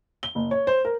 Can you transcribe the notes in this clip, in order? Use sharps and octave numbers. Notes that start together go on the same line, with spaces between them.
G7
F#1
C#5
C5
A#4